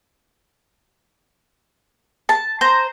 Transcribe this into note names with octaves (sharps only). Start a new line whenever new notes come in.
A5
C5 A#5